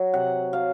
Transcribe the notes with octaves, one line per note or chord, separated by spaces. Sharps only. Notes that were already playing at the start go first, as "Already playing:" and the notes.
Already playing: F#3
C3 F#5
F#3 F5